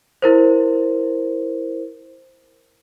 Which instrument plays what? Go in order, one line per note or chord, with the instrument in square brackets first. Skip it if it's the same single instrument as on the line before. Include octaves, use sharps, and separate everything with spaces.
[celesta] E4 A#4 C5